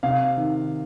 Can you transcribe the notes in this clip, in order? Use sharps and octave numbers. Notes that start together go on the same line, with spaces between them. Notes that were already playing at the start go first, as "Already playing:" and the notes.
C3 F5
D#3